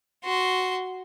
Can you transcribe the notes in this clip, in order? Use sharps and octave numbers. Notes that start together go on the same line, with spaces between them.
F#4 C6